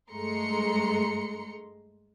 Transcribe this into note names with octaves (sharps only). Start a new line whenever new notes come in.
G2 G#3 A3 A#5 C6 C#7